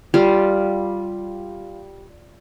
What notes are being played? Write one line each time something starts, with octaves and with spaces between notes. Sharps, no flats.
G3 F4